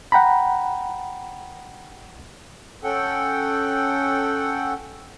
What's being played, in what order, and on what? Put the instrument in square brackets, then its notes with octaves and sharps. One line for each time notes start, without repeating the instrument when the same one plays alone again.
[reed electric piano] F#5 G5 A#5 B5
[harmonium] C#4 A4 F#5 G5